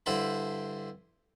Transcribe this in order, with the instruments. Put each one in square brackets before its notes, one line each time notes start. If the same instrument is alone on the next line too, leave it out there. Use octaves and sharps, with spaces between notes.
[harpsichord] G2 D3 E4 C5 G5 B5